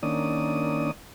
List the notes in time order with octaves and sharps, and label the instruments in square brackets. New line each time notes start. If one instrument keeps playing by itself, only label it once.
[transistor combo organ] D#3 A#3 C#4 D4 D5 D#6